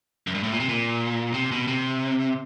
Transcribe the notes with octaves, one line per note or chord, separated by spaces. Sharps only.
F#2
G2
A2
A#2
C3
A#2
C3
B2
C3